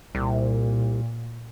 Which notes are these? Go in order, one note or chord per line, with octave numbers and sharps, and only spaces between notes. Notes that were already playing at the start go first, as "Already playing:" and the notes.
C2 A#2